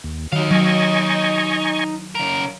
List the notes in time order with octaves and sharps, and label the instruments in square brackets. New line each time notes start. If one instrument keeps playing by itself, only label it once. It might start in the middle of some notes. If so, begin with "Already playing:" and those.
[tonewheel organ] D#2
[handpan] D#3 [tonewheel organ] F#3 [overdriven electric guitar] D#4 F5
[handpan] F#3 [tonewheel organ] D#5 G#5 C#6
[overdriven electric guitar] C#3 A#4